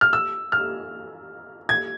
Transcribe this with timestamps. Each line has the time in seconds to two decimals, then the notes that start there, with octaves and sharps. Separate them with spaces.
0.01 F6
0.13 E6
0.52 F6
1.69 G#6